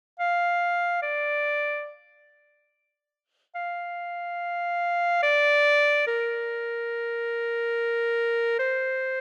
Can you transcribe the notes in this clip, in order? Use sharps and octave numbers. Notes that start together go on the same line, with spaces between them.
F5
D5
F5
D5
A#4
C5